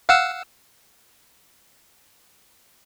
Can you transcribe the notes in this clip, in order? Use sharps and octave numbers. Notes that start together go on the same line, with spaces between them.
F5 F#5 E6